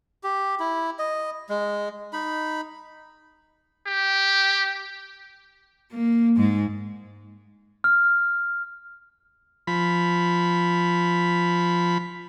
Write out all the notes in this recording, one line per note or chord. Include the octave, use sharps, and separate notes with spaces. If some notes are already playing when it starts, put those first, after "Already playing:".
G4
E4
D#5
G#3
D#4 B5
G4
A#3
G#2 G#3
F6
F3 B5